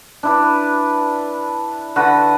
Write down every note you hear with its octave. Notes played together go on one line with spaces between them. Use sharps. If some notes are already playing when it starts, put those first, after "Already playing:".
D4 E4 B4
D3 F#4 B4 F#5